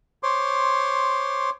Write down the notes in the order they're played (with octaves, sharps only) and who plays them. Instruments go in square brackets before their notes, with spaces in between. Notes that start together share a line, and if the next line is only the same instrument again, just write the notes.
[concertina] C5 C#5 C6 D6